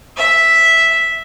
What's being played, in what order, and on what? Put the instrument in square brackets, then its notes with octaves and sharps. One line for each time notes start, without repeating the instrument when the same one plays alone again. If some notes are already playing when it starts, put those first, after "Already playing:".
[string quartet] E5